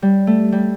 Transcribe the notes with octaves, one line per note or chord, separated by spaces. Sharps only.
G3
A3
G3